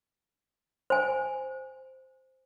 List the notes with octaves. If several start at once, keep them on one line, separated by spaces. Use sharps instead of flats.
C5 G#5